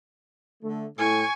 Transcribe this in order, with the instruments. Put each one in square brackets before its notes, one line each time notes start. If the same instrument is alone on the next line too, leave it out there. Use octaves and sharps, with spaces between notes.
[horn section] D3 A3
[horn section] A2 [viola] G#5 C#6